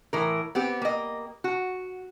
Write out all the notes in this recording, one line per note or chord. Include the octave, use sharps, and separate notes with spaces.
A2 E3 A#4
B3 C4 G4
A#3 D#5
F#4